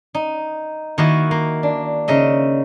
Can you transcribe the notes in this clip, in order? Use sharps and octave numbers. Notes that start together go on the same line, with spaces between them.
D#4
D#3 A#3 E4 F#4 D#5
A#3
D4
C#3 D#4 D#5 E5